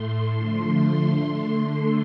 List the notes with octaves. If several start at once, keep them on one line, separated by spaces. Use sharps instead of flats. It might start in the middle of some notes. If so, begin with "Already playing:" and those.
Already playing: A2 A3 C6
D3 F3 A3 C6
D3 A3